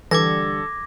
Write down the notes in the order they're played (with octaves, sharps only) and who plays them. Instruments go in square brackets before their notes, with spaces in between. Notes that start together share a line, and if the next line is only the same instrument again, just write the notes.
[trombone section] D3 G3 [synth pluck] E3 [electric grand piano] A4 [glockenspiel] D6 G#6 A#6